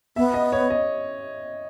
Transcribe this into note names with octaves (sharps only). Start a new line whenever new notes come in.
B3 E5
D#5
C#5
D#5